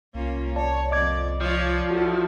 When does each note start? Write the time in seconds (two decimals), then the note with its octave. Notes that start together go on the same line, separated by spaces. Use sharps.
0.15 C2 A#3 C#4 F4
0.56 C#5 D5 A5
0.91 F2 D5 D#5 D6 G#6
1.41 F3 F4 C#5 D5
1.91 E4 F#4 A4